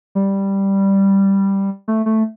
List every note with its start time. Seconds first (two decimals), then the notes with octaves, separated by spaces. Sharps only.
0.15 G3
1.88 A3
2.06 A3